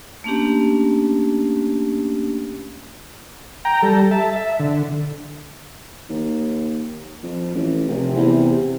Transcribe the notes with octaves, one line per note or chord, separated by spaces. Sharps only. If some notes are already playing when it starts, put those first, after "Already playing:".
A3 A#3 C#4 D4 G4
G5 A#5
G3 A4
E5 A5
E5
D3
D#2
F2
A1
F1 C3
E2